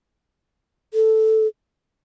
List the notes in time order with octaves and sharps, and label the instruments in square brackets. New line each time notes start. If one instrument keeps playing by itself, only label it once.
[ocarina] A4